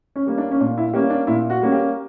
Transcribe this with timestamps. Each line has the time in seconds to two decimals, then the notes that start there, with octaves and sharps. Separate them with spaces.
0.16 C#4
0.26 G3 A#3 C#4
0.38 D4
0.51 C#4
0.60 A#2 D4
0.78 E4
0.93 G3 A#3 C#4 G4
1.10 D4
1.27 A#2 E4
1.50 F#4
1.61 G3 A#3 C#4
1.72 G4